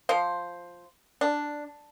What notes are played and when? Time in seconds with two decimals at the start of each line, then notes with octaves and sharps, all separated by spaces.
0.09 F3 C5
1.21 D4